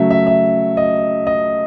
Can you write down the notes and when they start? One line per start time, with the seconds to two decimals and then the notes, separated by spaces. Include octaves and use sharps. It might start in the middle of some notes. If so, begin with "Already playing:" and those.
Already playing: C#3 F#3 A3 E5
0.11 E5
0.27 E5
0.77 D#5
1.27 D#5